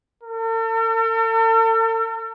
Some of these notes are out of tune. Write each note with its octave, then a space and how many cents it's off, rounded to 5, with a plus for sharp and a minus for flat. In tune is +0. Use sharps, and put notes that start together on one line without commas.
A4 +45